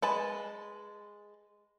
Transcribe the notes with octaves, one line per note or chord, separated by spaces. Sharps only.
G#3 B4 A5